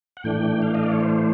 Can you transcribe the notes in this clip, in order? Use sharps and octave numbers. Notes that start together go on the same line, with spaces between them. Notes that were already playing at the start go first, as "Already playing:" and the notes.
F#5
A2 E3 A3 D4 G5
F5
D#5
D5
C#5
C5